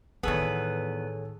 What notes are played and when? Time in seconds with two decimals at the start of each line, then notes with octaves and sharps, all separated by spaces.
0.23 E2 A2 D#3 B3 G#4 A4 C#5